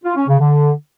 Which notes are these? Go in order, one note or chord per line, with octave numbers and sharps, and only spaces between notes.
F4
C#4
C#3
D3